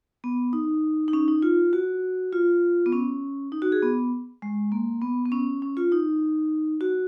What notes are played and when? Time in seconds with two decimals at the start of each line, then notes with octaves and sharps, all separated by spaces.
0.24 B3
0.53 D#4
1.08 D#4
1.13 C#4
1.28 D#4
1.42 F4
1.73 F#4
2.33 F4
2.86 B3
2.93 C#4
3.52 D#4
3.62 F#4
3.72 G#4
3.82 B3
4.42 G#3
4.72 A#3
5.02 B3
5.26 B3
5.32 C#4
5.62 C#4
5.77 F4
5.92 D#4
6.81 F#4